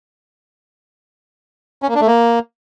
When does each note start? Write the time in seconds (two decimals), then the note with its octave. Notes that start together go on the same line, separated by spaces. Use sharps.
1.82 C#4
1.89 A#3
1.95 D4
2.01 A3
2.07 A#3